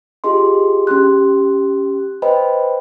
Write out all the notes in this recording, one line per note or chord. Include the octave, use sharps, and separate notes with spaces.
F4 G4 G#4 D#5 C6
C#4 G4 C6 F#6
B4 C5 D#5 G5 B5